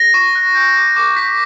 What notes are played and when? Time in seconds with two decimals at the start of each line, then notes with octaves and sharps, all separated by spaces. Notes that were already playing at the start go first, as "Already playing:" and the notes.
Already playing: A#6
0.14 C#6
0.35 F#6
0.55 G6
0.76 D6
0.96 D6
1.16 G6 B6